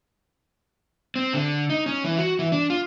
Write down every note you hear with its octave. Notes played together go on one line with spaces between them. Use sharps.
C4
D3
D#4
C#4
E3
F#4
E3
D4
F4